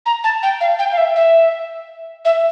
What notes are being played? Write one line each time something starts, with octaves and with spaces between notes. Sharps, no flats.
A#5
A5
G5
F5
G5
F5
E5
E5
E5